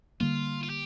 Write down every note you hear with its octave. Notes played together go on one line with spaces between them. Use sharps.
D3 G3 A#3 F4
F4
G4